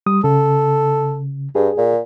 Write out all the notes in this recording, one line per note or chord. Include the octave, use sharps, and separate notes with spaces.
G3 D#6
C#3 A4
G2 G#4
A#2